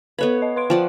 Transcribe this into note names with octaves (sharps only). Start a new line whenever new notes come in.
B3 A4 B4 C#5 B5
D#5
B4 C6 D7
F3 D5 F#5 G5